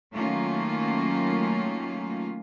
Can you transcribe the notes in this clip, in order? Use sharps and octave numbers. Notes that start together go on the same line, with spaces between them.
D#3 F#3 A3 A#3 C#4 F4